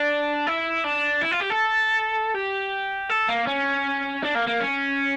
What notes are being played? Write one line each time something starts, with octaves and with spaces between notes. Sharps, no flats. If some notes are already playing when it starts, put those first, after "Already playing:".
Already playing: D4
E4
D4
E4
F4
G4
A4
G4
A4
A#3
C#4
D4
A#3
A#3
C#4